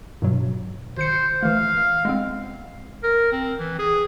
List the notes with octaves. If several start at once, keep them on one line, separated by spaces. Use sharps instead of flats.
G2 B2 F#3
G#1 C5 C#7
E3 A3 F5
G#3 B3 C4
A#4
C4
E3
G#4